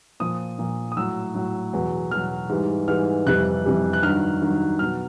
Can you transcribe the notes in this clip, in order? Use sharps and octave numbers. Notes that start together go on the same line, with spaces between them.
A#2 F3 D#6
A#2 F3
D#6
A2 F#3 E6
A2 F#3
E2 B2 F#3
E2 B2 F#3 F6
G#2 E3 G3
G#2 E3 G3 F6
F2 C3 E3 G3 F#6
F2 C3 E3 G3
F#6
G2 D#3 F#3 F6
G2 D#3 F#3
B2 F#3 F6